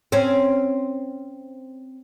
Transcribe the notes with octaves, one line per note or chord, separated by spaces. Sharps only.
C4 C#4